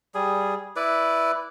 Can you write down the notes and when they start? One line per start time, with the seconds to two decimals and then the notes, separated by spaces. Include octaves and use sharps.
0.15 G3 G#4
0.76 E4 B4 D5